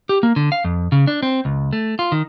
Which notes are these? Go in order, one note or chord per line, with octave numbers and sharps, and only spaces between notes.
G4
A#3
D3
F5
F2
C#3
D4
C4
C#2
A3
F4
D#3